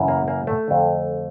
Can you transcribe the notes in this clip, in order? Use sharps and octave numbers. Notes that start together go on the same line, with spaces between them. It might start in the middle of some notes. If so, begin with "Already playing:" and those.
Already playing: F#2 C#3 E3
A#3
A#3
A3
F2 D3